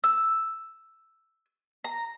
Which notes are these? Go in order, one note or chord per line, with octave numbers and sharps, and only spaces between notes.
E6
A#5